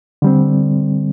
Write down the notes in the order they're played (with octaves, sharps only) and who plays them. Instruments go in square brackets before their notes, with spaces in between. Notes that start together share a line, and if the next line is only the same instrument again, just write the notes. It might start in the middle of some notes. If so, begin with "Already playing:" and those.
[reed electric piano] D3 G3 C4